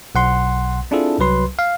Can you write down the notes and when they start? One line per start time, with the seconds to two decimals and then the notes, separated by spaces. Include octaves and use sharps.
0.15 B1 F#5 C6
0.91 C4 D4 E4 F4 G#4 A4
1.19 C2 F#3 B4 C6
1.59 F5